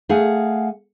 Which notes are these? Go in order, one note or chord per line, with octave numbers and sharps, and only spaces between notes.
A3 G#4 F5 F#5 G#5